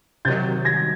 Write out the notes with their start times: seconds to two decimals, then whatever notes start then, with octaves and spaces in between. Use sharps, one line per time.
0.25 C3 D#3 F#3 G6 A6
0.65 G#6 A#6